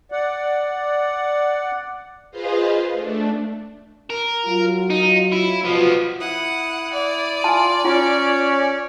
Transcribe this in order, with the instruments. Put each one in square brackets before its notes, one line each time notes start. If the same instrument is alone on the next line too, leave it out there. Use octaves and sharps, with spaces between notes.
[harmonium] D5 F#5
[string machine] F4 G#4 B4 C5 D#5 F5
A3 D4
[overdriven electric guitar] A#4
[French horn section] F#3 F4
[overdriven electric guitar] D#4
E4
[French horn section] B2 F4 [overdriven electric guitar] F3 B3
[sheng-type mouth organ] E4 D#6 [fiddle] F#5
[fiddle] D5
[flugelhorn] F4 [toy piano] G#5 A5
[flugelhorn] C#4 [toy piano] F4 F5 [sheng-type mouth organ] C#5